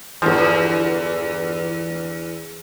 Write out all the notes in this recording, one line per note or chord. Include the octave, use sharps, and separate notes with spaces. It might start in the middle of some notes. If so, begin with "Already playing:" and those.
G1 E2 F3